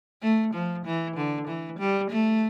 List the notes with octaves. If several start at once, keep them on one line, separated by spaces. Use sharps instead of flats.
A3
F3
E3
D3
E3
G3
A3